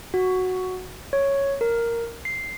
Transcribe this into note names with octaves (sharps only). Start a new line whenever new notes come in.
F#4
C#5
A#4
C7